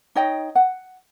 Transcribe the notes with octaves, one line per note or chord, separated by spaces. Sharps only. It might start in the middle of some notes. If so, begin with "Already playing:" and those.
D#4 C#5 D#5 G5
F#5